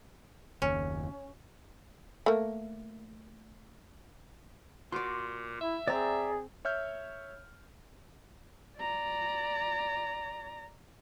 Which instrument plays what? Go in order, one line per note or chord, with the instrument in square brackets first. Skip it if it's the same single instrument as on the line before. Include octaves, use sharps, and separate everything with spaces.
[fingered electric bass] F#1 D#2 [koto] C#4
[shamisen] A3 A#3
[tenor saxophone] A#2 [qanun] F#4 D5 [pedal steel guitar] C6
[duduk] E4 [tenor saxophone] E5
[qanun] C4 [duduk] G#4 [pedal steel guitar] D5 A#5
[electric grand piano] C#5 E5 F6 G6
[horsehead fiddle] D5 A#5